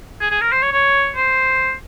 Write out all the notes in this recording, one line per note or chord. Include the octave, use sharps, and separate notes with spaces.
G#4
G#4
A#4
C5
C#5
C#5
C5